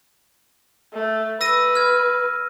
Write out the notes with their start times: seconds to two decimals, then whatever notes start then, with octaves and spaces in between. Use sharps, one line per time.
0.94 A3
1.41 B4 E6 A#6 D#7
1.75 F6 G#6